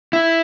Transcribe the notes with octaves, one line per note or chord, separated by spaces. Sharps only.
E4